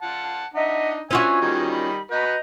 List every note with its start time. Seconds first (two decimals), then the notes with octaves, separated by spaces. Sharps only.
0.02 F4 F#5 A5
0.54 D4 D#4 D#5 E5 F#5
1.11 C#4 D4 F4 F#4 E5 G#5
1.41 D#3 G3 D#4 G#6
1.69 B5
2.11 F#4 B4 D#5 F#5 A#5 G6